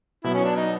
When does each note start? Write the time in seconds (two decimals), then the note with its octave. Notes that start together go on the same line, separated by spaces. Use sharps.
0.24 B2 F#3 B3 E4
0.35 C#4
0.45 D4
0.56 D#4